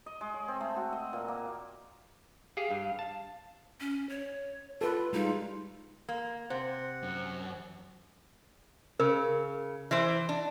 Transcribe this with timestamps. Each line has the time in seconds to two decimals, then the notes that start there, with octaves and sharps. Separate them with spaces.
0.06 D#5
0.21 G#3
0.34 C#5
0.48 C4
0.61 A3
0.76 F#4
0.93 D#5
1.13 A#2
1.28 A#3
2.57 G4 G#4 F5
2.71 G2
2.99 A5
3.80 C#4
4.09 C#5
4.81 F4 A4 B4
5.13 G3 G#3 D#4 F4
6.09 A#3
6.50 C3 C5 F#5
7.03 F#2
9.00 C#3 A#4
9.91 E3 C5
10.29 D4